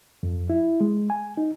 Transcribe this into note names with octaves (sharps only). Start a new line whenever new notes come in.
F2
E4
G#3
G#5
D#4